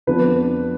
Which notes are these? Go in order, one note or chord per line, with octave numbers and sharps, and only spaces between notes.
F2 F3 B3 D4 B4